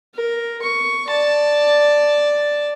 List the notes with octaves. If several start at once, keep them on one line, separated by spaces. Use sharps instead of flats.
A#4
C#6
D5 A5